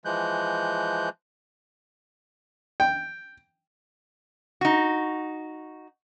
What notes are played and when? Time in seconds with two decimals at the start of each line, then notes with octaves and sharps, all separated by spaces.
0.05 E3 F3 G#3 F#6 G6
2.80 G5
4.61 D#4 F#4